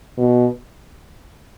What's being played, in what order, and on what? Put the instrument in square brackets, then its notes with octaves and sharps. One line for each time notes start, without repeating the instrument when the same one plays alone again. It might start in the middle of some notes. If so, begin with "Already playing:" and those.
[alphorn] B2